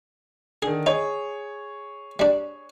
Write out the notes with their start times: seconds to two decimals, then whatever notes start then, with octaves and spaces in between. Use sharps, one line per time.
0.62 D3 D#3 G#4
0.86 D#4 G#4 C#5
2.19 G3 D4